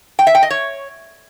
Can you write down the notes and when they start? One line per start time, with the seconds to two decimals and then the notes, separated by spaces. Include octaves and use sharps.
0.19 G5
0.27 E5
0.35 G5
0.43 D#5
0.50 C#5